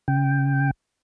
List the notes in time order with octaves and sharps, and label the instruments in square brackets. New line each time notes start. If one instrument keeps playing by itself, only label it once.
[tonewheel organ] C#3 G5